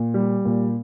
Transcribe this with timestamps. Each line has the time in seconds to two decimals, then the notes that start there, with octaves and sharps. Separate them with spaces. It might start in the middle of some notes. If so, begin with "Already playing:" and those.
Already playing: A#2
0.14 G3
0.45 A#2